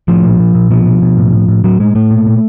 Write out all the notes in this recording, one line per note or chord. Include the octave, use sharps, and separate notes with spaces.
A2 F3
A#2
A#2
A#2
B2 F3
B2
B2
A2
A2
A2
A2 F#3
A2 G#3
A2 A3
A#2
A#2